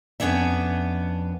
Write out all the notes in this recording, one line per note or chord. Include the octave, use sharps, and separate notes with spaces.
F2 B3 C#4 D4 E5